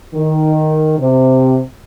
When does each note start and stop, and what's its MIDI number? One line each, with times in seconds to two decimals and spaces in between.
0.14 0.98 51
0.99 1.60 48